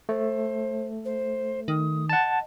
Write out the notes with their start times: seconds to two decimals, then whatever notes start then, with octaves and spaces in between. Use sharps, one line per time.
0.09 A3 C5
1.04 C5
1.68 D#3 D#6
2.09 D#5 F#5 A5